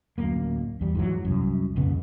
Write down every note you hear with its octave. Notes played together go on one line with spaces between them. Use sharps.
D1 F#2 A#3
E2 G3
G#2 E3 F#3
C2 F#2
D#1 F2 C#3 B3